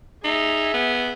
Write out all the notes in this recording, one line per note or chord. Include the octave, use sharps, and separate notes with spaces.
D#4 G#4 E5
B3